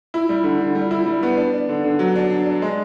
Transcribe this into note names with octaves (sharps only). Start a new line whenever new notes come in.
E4
G3
D3
D3
G3
E4
G3
B3
D4
D4
D3
D3
F#3
D4
D4
D4
G#3